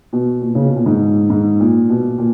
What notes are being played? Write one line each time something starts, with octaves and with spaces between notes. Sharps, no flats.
B2
A#2
C#3
B2
A#2
G#2
G#2
A#2
B2
A#2